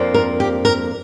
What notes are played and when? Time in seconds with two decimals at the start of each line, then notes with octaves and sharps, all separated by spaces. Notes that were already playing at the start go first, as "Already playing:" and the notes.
Already playing: F2 F3 A#3 D4
0.14 A#4
0.40 G4
0.65 A#4